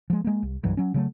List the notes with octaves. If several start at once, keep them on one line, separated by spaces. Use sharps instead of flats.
F3 G#3
G#3 A#3
C2
C2 G2 E3 F#3
F#3 C#4
C#3 F#3 A3